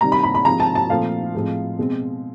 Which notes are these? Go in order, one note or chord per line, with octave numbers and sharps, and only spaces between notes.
C3 D#3 G3 C4 A#5
B5
B5
B5
C3 F3 G#3 C4 A#5
A5
A5
A#2 F3 A3 C4 F5
A2 F3 G#3 C4
B2 G#3 C4